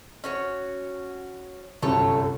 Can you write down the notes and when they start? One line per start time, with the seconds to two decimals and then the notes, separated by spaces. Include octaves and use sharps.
0.24 C#4 F#4 C#5
1.82 G1 C2 F#2 A3 A4 C#5